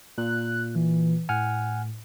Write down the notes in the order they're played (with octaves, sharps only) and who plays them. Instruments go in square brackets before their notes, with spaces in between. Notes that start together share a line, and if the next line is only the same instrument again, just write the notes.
[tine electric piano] A#2 [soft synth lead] F#6
[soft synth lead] E3
[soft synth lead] A2 [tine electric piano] F#5 G#5 F6